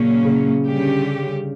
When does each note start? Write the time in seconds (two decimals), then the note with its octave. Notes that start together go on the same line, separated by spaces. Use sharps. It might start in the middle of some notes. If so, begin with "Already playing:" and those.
Already playing: A#2 C#3 F#3 A#3 C#4
0.24 C#3
0.65 D3 G3 C#4 G4